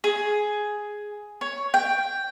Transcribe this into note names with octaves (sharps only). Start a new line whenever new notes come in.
G#4
C#5
G5